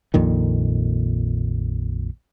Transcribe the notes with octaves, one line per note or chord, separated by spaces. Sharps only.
A#1 F2 A#2 D#3